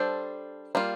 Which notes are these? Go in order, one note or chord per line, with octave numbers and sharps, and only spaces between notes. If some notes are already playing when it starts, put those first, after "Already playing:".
Already playing: G3 D4 A4 C5
G3 A#3 F4